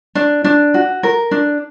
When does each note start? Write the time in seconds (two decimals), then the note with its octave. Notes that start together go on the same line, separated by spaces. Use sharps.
0.15 D4
0.44 D4
0.74 F#4
1.03 A#4
1.31 D4